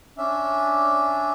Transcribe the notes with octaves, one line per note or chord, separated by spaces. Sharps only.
C#4 D4 E5